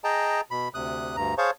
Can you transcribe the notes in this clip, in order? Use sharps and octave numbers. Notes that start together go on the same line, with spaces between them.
G#4 D#5 G5 A5 A#5
B2 B5
D2 C3 D#6 F#6
D2 G2 A#5
G#4 C5 C#5 F5 A5 C#6